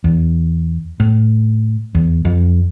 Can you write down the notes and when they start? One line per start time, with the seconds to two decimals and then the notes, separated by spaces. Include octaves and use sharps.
0.04 E2
1.00 A2
1.95 E2
2.25 F2